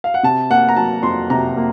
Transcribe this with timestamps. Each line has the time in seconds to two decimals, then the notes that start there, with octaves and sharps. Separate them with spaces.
0.04 F5
0.14 F#5
0.23 C3 A5
0.50 A#3 F#5
0.69 A#5
0.76 F#3 A5
1.03 F2 C6
1.30 C3 A#5
1.57 A#3